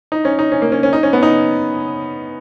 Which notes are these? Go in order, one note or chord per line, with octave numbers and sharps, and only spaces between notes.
D#4
C#4
D#4
C#4
A#3
C#4
C#4
D#4
C#4
B3
D#4